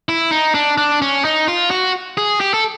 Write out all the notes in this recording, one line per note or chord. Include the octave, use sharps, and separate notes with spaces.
E4
D#4
D4
D4
C#4
D#4
F4
F#4
G#4
G4
A4